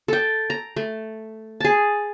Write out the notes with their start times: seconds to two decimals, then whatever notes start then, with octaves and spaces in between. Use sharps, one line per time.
0.08 A4 G5
0.50 A#5
0.76 A3
1.60 G#4 A5